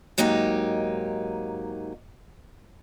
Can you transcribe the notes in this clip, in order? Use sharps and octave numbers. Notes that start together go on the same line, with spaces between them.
G#2 F#3 A#3 D#4 G4